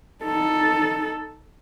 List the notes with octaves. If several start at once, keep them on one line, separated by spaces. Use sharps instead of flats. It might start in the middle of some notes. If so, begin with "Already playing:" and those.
D#4 A4